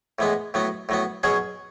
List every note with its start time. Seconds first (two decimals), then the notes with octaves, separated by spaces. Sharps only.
0.19 A2 E3 G#3 B3
0.54 A2 F#3 B3
0.89 A2 F#3 B3
1.23 B2 F#3 C#4 G#4